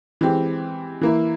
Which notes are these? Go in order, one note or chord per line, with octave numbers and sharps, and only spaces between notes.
E3 G#3 C4 G4
E3 A#3 E4